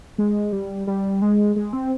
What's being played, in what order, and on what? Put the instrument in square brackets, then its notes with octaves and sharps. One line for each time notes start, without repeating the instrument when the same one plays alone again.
[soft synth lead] G#3
G3
G3
G#3
G#3
C4